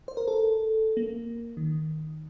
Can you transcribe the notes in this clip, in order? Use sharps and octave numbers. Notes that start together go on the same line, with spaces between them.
C5
A#4
A4
A#3
D#3